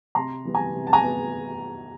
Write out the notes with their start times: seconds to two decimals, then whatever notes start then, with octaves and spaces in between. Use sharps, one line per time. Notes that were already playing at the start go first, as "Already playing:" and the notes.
0.15 C3 A#5 C6
0.45 E3 G3 B3
0.55 G#5 A#5
0.74 C3
0.87 A5
0.93 G#5 A#5
1.03 B3